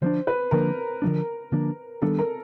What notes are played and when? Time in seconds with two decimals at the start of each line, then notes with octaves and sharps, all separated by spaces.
0.01 D3 F3 A#3 D4 C5
0.27 B4
0.51 D3 F3 A#3 D4 A#4
1.02 D3 F3 A#3 D4
1.52 D3 F3 A#3 D4
2.02 D#3 G3 B3 D4 A4
2.19 A#4